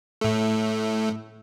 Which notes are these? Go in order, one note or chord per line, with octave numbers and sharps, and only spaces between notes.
A2 A3